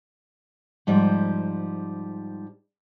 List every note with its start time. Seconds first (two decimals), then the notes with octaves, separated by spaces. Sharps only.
0.87 G#2 F3 G3